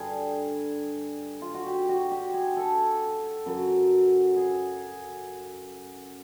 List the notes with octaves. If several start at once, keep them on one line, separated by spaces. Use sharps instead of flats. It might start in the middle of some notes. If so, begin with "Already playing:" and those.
Already playing: G2 D3 G3 G#4
F4
F#4
G4
F#4
G4
G#4
A4
F#2 C#3 F#3
G#4